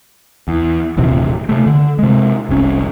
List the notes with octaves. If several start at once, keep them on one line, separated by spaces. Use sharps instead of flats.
E2
D#1 A1 C3 C4
C3 A3
D3
C3 G#3
F1 C2 C#4